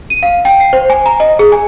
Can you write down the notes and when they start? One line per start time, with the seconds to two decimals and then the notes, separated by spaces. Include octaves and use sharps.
0.10 D#7
0.23 F5
0.45 G5
0.60 C7
0.73 C5
0.90 G#5
1.06 A#5
1.20 D#5
1.39 G#4
1.52 G#5